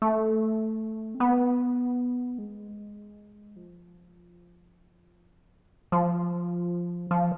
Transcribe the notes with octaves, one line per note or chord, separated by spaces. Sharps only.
A3
C4
B3
G#3
F3
F3
F3